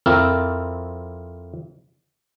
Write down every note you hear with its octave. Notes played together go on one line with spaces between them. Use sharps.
F2 C4 E4 F4 A#4